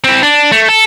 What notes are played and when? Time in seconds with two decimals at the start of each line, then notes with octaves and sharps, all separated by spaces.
0.04 C4 E4
0.23 D4
0.52 A3
0.69 A4